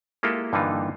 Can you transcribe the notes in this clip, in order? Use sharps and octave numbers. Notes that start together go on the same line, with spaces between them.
G#3 A#3 E4 F4 G4 A4
G2 D3 E3 A#3 D#4 F4